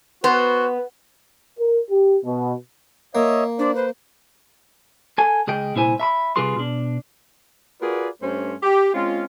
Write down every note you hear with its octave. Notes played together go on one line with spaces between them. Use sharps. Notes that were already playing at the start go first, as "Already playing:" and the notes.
B3 F#4 B4 C5
A#4
G4
B2
A#3 C#5 D#5 E5
D4 C5 D5
B4 C5
A4 G#5
C#2 G#4 D#5 G5
C2 A#2 E4 C5 G#5
E5 A#5 B5
C3 G3 F4 G#4 B4 C6
B2 D4
F4 F#4 G#4 A#4 B4 D5
G2 A3 C#4 C5
G4
G#3 C4 C#4 F4